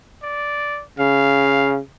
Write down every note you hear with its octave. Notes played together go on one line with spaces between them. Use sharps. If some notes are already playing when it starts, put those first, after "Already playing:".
D5
C#3 F5